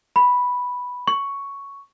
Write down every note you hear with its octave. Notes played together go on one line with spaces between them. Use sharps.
B5
C#6